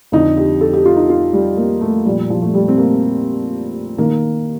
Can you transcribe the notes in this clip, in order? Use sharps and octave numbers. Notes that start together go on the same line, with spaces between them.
F2 D3 F3 D#4
G4
A4
G4
F4
D#4
F4
G3
A#3
A3
A#2 F3 G3
F3
A3
G3
C4
A#3
D#3 A#3